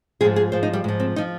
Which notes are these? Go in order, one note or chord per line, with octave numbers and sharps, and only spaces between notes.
G#2 F3 G#4
G#4
G#2 F3 C5
D#4
G3
G#2 F3
C4
F3 D#4